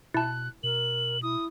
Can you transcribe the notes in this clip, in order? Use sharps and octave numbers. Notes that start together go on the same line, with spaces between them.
B2 E4 A5 F#6
B2 A#4 F#7
E4 D#6